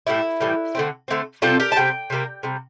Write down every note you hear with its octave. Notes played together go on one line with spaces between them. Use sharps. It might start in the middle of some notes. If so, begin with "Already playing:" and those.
A2 E3 G3 E4
A2 E3 G3
D3 A3 C4
D3 A3 C4
C3 G3 C4 F4 A4
G4 A#4
A5
C3 G3 C4 G5
C3 G3 A#3
C3 G3